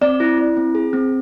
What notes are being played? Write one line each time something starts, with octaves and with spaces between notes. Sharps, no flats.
C4 D5
E4
E4
C4
G#4
C4